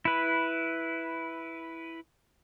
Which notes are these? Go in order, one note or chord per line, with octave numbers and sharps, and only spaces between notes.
E4 B4